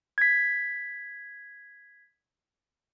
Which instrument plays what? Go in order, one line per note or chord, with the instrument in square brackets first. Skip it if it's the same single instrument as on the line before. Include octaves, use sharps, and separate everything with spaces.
[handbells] G#6 B6